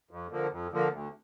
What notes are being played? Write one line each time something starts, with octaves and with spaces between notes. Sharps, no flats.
F2
D3 F3 A#3
F2
D3 F3 A#3
D2